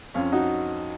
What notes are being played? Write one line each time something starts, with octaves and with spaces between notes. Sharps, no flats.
F2 C#4 F4
D#4 F#4